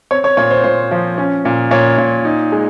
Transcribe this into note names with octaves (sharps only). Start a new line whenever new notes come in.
C4 C#5
C#5
A#2 C#5
C5
A#2 C5
F3
C#4
A#2
A#2 C#5
A#2
D#4
G#3